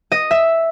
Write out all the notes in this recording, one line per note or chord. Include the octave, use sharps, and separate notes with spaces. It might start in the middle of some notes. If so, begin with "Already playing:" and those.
D#5
E5